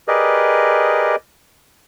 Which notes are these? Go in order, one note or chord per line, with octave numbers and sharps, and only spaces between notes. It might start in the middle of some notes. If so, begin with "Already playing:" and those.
G4 G#4 A#4 B4 D5 D#5